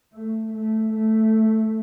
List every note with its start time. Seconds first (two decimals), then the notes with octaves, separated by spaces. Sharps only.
0.13 A3
0.54 A3
0.94 A3